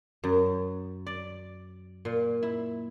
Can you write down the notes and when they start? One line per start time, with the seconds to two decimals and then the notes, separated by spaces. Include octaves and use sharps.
0.24 F#2
1.07 D5
2.05 A#2
2.43 E4